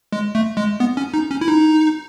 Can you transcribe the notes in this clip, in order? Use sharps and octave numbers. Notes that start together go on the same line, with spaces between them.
G#3
A3
G#3
B3
C#4
D#4
C#4
E4
D#4